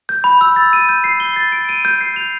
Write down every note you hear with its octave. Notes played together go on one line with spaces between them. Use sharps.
G6
B5
E6
A6
D#7
G6
C7
G7
A6
D7
D#7
G6
C7
F7